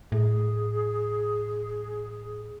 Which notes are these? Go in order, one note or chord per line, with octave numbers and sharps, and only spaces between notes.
A2 G#4